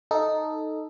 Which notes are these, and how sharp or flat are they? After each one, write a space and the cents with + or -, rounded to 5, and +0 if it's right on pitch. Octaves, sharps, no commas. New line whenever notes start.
D#4 +0 A4 +0